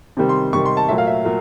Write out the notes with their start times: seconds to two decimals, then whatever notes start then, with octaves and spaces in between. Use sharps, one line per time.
0.17 C3 D#3 G3
0.29 C6
0.53 C3 D#3 G3 C#6
0.66 C6
0.77 A5
0.89 A#2 F#3 A3 E5
0.98 F5
1.07 E5
1.25 A#2 F#3